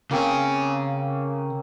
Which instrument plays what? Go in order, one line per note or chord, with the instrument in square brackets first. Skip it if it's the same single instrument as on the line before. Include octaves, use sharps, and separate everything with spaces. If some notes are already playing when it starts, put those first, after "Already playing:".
[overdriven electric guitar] C#3 G#4 [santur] A#3 C4 C#4